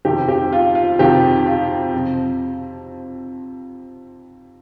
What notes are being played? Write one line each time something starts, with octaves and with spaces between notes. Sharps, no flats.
F2 C3 D#3 G4
G4
F4
F4
F2 C3 D#3 G4
F4
F2 C3 F3